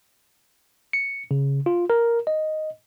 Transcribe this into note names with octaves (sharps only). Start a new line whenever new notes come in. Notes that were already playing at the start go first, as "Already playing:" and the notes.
C#7
C#3
F4
A#4
D#5